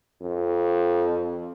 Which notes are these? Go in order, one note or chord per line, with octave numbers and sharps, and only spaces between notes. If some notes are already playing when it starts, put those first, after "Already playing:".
F2